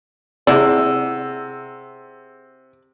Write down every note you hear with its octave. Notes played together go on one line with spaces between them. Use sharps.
C3 E4 G#4 D5 F#5 E6